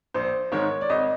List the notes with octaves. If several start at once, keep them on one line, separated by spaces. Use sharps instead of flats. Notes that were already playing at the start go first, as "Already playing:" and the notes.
A#1 C5
G#2 D#3 G#3 C#5
D5
G#1 D#5